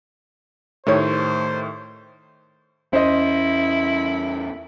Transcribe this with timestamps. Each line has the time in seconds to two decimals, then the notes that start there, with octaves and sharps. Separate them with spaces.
0.87 A2 D#3 A3 G4 C5 C#5
2.93 E2 C#4 E4 C5 D#5